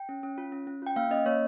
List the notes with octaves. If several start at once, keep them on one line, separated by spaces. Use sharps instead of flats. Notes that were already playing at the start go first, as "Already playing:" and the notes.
Already playing: G5
C#4
C#4
F4
C#4
C#4
F4 G5
A#3 F5
C#4 D#5
A#3 C#5